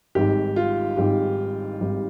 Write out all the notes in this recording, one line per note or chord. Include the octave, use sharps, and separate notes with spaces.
G#1 G#2 G3 G4
F4
G#1 G#2 G3 G4
G#1 G#2 G3